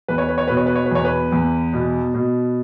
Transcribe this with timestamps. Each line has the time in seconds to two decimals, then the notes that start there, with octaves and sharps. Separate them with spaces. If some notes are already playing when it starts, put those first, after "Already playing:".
0.08 E2 B4
0.18 C#5
0.28 B4
0.38 C#5
0.47 B2 B4
0.57 C#5
0.66 B4
0.75 C#5
0.86 B4
0.91 E2 C#5
1.05 B4
1.32 E2
1.73 B2
2.14 B2